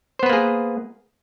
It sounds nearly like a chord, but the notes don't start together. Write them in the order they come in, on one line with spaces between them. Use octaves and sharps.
C5 B3 B4 A#3 G#4